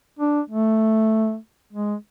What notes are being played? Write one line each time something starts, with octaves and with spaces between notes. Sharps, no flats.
D4
A3
G#3